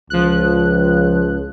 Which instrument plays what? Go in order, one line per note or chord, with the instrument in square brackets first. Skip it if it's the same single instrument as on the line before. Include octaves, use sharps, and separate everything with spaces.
[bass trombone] C#2 [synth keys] F3 F#6